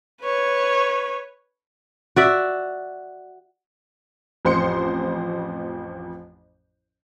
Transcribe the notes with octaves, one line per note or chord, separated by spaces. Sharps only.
B4 C#5
F#4 D5 E5
A1 F2 C5 C6 C#7